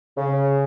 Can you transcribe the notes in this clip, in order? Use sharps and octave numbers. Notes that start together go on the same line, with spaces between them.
C#3